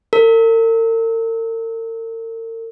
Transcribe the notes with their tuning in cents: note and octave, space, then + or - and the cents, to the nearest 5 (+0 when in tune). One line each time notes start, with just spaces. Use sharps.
A#4 -45